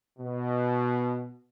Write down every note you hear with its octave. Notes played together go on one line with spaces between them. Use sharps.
B2